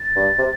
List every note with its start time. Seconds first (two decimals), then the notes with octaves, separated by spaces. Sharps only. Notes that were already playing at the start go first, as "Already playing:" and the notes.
Already playing: A6
0.16 G2
0.39 C3